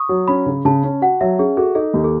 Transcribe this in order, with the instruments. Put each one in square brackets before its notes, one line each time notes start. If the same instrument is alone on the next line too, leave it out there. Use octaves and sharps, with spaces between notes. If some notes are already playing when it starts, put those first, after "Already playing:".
Already playing: [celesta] C#6 D#6
[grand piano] F#3
[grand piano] C#4 [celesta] B5
[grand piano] C#3
[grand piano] C#3 [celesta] A5
[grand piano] C#4
[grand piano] F#4 [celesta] F#5
[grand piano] F#3 [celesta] E5
[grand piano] C#4 [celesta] G#4
[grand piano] F#4 [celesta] A4
[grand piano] D#4 [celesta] A4
[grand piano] D#2
[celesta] A4